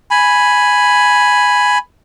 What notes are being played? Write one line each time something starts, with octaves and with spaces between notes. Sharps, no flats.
G#5 B5